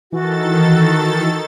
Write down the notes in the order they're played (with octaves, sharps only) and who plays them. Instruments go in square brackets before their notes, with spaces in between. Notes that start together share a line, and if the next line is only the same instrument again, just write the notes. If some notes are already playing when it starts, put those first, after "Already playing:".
[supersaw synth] D#3 A4 A6 [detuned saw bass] E3 [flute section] F#4